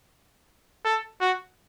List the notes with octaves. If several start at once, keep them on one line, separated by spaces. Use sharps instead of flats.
A4
F#4